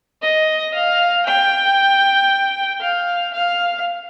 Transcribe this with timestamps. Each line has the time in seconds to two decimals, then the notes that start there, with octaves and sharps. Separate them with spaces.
0.22 D#5
0.74 F5
1.26 G5
2.81 F5
3.34 F5